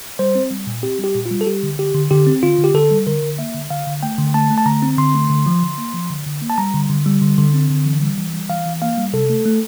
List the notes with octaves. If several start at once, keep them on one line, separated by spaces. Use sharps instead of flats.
G3 C5
C4
G3
A#2
C4 G4
G3 G4
A#2
F4
G3
A4
G3 G4
D3
D3 G4
D3
D3 G4
C4
D3 F4
D3
G4
D3 A4
G3
D3 A#4
D3
A#3 E5
D3
D3 F5
D3
A3 G5
D3
A3 A5
A3
A5
D3 A#5
C4
D3 C6
A3
D3
F3
D3
A#3
F3
D3
D3
A#3
A5
G3 A#5
D3
D3
G3
D3
D3
C4
D3
E3
G3
E3
G3
E3 F5
E3
A#3 F5
G3
C3 A4
A3
A3